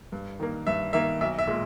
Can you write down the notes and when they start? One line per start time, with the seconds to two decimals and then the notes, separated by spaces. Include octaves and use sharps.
0.12 G2
0.40 D#3 A#3
0.67 G2 E5
0.93 D#3 A#3 E5
1.21 B1 E5
1.39 E5
1.47 A#2 G#3